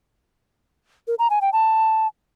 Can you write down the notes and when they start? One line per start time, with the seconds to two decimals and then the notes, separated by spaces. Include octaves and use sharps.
1.08 A#4
1.19 A#5
1.30 G#5
1.41 G5
1.53 A5